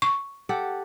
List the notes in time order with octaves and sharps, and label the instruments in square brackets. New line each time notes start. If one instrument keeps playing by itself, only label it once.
[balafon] C#6
[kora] G4 A4 F#5